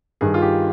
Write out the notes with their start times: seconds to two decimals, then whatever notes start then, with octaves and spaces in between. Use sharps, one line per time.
0.21 G2 D#3 G#4
0.34 F4
0.42 G4